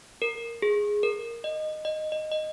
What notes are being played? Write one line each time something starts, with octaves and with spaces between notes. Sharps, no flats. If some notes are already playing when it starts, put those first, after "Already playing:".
A#4
G#4
A#4
D#5
D#5
D#5
D#5